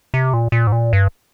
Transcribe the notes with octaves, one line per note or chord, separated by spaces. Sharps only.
C3
A#2
A#2
G#2
A#2
G2